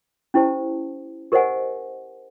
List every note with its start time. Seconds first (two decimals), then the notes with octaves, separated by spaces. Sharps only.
0.34 C#4 E4 G4 C5 A5
1.32 G4 A#4 C5 D#5 F#5 G#5